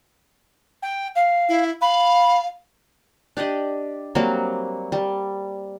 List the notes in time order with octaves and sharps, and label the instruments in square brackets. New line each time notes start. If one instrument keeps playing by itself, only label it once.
[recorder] G5
F5
[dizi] E4
[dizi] F5 [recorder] B5
[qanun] D4 G4 D5 D#5
F#3 G3 A#3 C4
G3